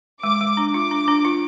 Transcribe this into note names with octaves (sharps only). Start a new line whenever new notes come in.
G#3 D6
G#3
D4
F4 D6
D4
D4
F4